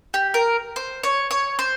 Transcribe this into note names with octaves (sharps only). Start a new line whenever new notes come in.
G4
A#4
C5
C#5
C#5
C5